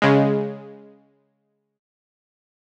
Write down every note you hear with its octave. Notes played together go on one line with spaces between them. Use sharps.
C#3 G#3